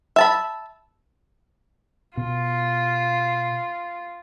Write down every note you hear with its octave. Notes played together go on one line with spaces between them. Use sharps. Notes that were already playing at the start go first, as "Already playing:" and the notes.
E5 A5 B5
B2 F4